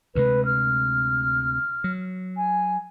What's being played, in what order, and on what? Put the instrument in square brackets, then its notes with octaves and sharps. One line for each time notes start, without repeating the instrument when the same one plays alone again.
[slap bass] D2 C3 G#3 [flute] B4
[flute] F6
[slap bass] F#3
[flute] G#5